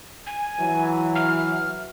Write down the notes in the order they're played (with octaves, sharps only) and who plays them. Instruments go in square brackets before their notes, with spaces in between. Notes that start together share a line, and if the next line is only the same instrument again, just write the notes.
[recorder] G#5
[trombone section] E3 F#3
[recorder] F6